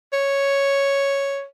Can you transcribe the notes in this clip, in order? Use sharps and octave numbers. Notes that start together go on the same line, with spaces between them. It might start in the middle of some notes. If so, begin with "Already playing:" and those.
C#5